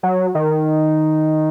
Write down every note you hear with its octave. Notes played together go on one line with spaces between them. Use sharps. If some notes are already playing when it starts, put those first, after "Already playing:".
F#3
D#3